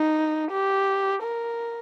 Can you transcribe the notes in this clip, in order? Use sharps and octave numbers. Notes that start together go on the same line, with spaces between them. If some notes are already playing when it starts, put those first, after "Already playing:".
Already playing: D#4
G4
A#4